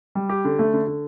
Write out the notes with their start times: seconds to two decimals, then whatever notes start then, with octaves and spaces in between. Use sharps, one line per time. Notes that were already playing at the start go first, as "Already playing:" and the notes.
0.15 G3
0.29 G4
0.45 D3
0.59 A3
0.74 D3
0.87 D3